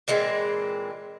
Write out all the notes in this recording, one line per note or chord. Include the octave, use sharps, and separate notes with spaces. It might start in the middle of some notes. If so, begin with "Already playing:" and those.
A#2 E3 G#3 C4